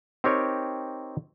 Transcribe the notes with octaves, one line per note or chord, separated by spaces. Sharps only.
C4 D#4 G4 A#4 C#5